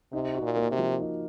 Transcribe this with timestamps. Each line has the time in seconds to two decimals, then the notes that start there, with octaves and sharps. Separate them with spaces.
0.12 C3 D#4
0.34 F#4
0.42 A#2
0.57 A#3
0.71 C3
0.78 F3
1.00 D#4